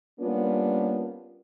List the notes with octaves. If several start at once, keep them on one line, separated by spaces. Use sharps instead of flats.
G3 A#3 B3 C#4 D4 F4